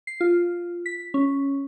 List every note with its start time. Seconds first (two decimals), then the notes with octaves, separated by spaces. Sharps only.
0.07 C7
0.21 F4
0.86 B6
1.14 C#4